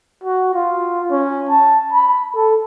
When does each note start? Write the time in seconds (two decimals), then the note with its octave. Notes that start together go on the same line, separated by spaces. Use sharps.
0.24 F#4
0.54 F4
1.11 C#4
1.49 A5
1.93 B5
2.35 A4